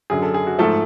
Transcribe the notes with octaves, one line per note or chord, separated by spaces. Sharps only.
F#2 D3 F#3 G#4
A4
G#4
F#4
G#2 F3 A3 A4